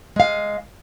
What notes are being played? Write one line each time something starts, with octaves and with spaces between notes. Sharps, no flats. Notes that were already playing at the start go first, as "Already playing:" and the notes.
G#3 F5